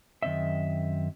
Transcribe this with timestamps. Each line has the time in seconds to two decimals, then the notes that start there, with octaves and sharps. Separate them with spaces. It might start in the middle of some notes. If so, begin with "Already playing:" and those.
0.23 F#2 D#3 E3 C4 D#5 E5